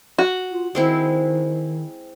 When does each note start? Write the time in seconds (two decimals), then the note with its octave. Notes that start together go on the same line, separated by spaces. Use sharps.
0.18 F#4
0.51 F4
0.75 D#3 G#3 C4 E4